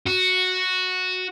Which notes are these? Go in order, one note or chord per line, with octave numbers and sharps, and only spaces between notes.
F#4